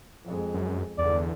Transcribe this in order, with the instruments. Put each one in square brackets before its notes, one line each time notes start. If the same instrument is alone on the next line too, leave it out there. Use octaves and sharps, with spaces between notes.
[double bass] F2 G#3
[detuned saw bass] F#2
[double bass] G1 D3 [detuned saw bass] E2 [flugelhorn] D5